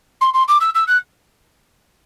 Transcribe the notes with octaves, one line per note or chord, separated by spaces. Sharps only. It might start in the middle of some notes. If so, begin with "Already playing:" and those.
C6
C6
D6
E6
E6
F#6